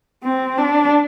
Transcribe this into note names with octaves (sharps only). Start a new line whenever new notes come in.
C4
D4